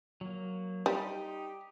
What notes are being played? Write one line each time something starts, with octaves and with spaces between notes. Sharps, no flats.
F#3 A#3
G3 D#4 G4 C6